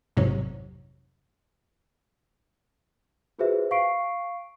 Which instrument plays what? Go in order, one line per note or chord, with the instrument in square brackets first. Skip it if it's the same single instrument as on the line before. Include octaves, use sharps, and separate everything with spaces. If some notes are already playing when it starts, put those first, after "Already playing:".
[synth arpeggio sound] A1 F2 G#2 C3 F#3
[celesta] F4 F#4 G#4 B4 C5 E5
F5 C#6 C7 D7